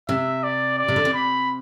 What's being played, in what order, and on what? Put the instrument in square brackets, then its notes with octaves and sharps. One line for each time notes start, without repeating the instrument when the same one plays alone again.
[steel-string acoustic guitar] C3 [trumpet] E5
[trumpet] D5
D5
[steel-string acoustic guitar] C3
D3
C3
[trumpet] B5